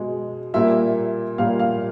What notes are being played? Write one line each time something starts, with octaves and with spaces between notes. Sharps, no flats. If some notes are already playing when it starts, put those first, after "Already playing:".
Already playing: B2 G#3
A#2 G3 A#3 E5
A#2 G3 A#3 F5
F5